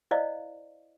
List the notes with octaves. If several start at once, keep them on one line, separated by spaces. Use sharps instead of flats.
E4 C5 D5 D#5 F5